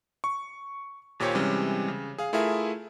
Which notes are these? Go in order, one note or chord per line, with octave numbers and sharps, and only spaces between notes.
C#6
D#2 A#2 G4 C5 C#5
C3 E3 G3 G#3 C#4
C#3
G#4 F5
A3 E4 F4 G#4 A#4 E5